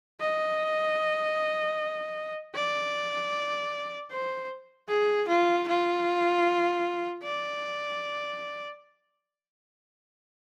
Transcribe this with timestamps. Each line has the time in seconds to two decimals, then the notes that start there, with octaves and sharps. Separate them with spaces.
0.21 D#5
2.55 D5
4.11 C5
4.89 G#4
5.28 F4
5.68 F4
7.24 D5